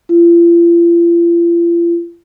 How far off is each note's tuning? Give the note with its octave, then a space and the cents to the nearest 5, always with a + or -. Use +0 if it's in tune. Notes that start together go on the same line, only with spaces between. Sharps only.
F4 -45